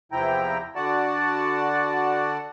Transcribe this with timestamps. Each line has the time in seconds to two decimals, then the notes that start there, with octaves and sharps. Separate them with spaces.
0.12 E2 C3 F3 E4 G5 A#5
0.76 D3 F#4 D5 F#5 A5